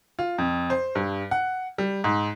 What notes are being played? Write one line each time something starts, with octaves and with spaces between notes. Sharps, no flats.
F4
F2
C5
G2
F#5
G3
G#2